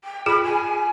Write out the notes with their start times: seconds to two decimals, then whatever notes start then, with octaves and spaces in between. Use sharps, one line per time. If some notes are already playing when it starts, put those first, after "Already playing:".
0.04 G5
0.26 F4 G#4 B5
0.44 G#5